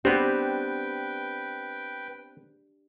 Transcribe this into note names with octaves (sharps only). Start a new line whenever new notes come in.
B3 C4 D4 G4 B4 G5